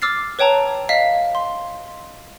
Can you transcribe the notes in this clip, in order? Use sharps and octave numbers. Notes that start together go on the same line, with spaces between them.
D6 E6 F6 A6 C7
B4 C#5 G5 A5 A#5
D#5 F5 B6
C6